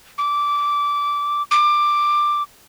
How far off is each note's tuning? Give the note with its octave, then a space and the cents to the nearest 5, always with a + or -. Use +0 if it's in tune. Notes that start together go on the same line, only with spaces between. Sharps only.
D6 -15
D6 +15